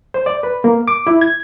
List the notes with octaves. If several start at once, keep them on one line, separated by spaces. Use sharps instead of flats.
C5
D5
B4
A#3
D6
E4
G#6